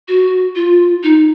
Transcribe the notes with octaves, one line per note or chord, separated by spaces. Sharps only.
F#4
F4
D#4